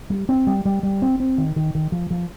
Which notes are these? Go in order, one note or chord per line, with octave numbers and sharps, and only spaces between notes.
G3
C4
G3
G3
G3
C4
C4
D#3
D#3
D#3
F3
F3